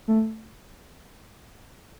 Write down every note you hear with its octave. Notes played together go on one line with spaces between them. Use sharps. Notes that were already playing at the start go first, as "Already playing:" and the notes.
A3